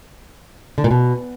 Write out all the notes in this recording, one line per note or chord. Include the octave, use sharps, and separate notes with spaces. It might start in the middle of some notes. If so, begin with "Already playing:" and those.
D3
A#2
B2